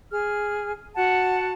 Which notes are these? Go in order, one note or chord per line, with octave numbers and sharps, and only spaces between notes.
G#4 F6
F#4 F#5 A5